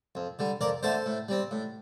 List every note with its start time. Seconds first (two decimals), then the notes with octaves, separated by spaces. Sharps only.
0.15 F2
0.39 D3 G3
0.61 F2 A#4 D5
0.83 D3 A3 A4 C5
1.06 A2
1.29 G3 C4
1.51 A2